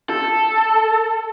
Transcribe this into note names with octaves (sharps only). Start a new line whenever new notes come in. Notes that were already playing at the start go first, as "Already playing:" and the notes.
A4